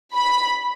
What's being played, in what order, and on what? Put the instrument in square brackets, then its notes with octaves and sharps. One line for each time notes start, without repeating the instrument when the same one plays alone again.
[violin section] B5